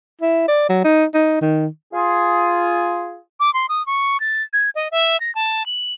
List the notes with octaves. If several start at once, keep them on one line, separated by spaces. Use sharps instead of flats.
E4
D5
F#3
D#4
D#4
D#3
F4 G#4
D6
C6
D#6
C#6
A6
G#6
D#5
E5
A#6
A5
F#7